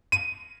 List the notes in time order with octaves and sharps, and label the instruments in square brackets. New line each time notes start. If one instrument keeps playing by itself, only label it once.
[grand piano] D#7